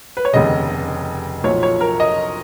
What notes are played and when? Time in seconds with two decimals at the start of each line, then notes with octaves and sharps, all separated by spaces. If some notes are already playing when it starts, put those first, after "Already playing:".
0.17 B4
0.25 C#5
0.33 F1 D#2 C#3 D#5
1.44 B1 A#2 F3 C#5
1.63 C#5
1.81 A#4
2.00 D#5